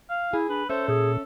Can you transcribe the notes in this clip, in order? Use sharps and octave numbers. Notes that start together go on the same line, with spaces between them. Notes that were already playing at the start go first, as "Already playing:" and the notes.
F5
E4 G#4
D4 B4
C#4 A4 C5 E5
A#2 G#4